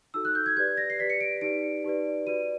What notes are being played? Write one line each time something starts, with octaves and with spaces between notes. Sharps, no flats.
D#4 F#4 A4 E6
F#6
G6
G#6
G4 B4 D5 G#6
A#6
C7
G4 B4 D5 B6
C#7
D7
D#4 G4 B4 D5 D7
D#4 G4 B4 D5
F#4 B4 D5 D#7